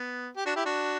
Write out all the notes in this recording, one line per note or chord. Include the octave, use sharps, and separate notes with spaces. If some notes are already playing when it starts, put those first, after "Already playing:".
Already playing: B3
G4
D4 F#4
E4 G4
D4 F#4